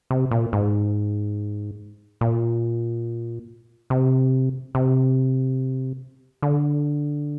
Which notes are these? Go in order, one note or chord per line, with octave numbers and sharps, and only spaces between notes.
C3
A#2
G#2
A#2
C3
C3
D3